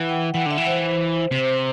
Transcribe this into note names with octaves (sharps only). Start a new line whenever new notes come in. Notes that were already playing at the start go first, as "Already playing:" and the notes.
Already playing: E3 F#5
G5
E3 F#5
D3 E5
E3
C5
C3 C5